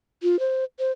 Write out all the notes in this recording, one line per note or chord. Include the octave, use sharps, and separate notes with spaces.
F4
C5
C5